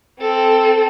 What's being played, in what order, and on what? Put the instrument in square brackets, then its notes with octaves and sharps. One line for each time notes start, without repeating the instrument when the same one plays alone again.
[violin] C4 A4